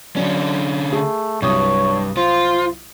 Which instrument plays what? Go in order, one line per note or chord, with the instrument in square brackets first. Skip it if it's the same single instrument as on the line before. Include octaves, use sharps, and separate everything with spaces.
[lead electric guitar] D3 C#4 [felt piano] F#3 D4
[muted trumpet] A3 [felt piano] G#4
[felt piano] C2 F#3 D#6 [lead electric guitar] G2 [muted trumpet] C#5
[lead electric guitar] F4 [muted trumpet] C5